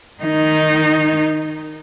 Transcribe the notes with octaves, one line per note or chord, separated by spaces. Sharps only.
D#3 D#4